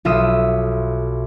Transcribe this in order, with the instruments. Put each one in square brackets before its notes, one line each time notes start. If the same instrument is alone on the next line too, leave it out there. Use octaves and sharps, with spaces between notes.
[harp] B1 F4 A4 E5 D#6 D#7